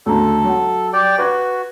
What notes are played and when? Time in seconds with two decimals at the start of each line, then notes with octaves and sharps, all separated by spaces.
0.06 D2 C#3 A4 A#5
0.44 F#3 F#5
0.93 G4 D5 G5
1.18 F#4 B4 F#6 G#6